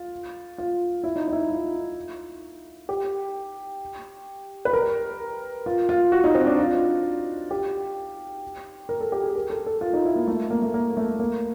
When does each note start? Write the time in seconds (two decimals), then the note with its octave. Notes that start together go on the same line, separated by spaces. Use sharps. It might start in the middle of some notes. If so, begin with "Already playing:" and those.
Already playing: F4
0.58 F4
1.03 E4
1.16 D#4
1.28 D#4
1.33 E4
1.39 D#4
1.50 F4
2.89 G4
4.65 B4
4.73 A#4
5.66 F4
5.89 F4
6.12 F#4
6.24 D#4
6.35 C4
6.46 D4
6.58 F4
7.51 G4
8.89 A#4
9.01 A4
9.12 G4
9.24 G#4
9.35 A#4
9.50 A4
9.66 A4
9.81 F4
9.93 D#4
10.05 E4
10.15 A#3
10.27 A3
10.50 A#3
10.62 A3
10.74 A#3
10.97 A3
11.20 A#3